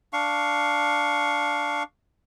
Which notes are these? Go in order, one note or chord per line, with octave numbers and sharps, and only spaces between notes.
D4 F5 C#6